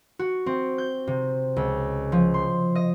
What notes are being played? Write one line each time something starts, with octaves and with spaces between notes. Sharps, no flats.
F#4
C4
G6
C3
C#2
F3
C6
D#5